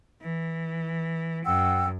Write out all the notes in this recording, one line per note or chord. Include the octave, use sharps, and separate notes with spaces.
E3
F#2 F#5 G5 E6